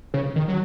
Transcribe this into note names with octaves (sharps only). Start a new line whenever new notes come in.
C#3
D#3
F#3